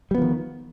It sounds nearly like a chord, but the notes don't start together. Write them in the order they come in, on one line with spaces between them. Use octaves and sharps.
G3 B3 F3 D#3